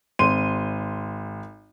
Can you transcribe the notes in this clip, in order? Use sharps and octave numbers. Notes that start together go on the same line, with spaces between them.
G#1 C6 D#7